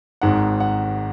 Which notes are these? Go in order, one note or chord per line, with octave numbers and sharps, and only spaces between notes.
G#1 G#2 D#3 F#5
F#5